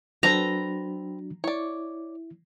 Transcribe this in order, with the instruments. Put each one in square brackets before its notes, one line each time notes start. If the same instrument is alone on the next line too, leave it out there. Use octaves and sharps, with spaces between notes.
[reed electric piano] F#3 D4 F#4 [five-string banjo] C4 A4 B4 [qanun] A#5
[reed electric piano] E4 [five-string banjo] C#5 D5